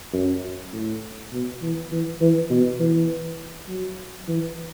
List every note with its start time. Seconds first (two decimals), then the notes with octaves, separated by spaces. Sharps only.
0.13 F#2
0.73 A2
1.32 B2
1.62 E3
1.92 E3
2.21 E3
2.50 B2
2.80 E3
3.68 F#3
4.28 E3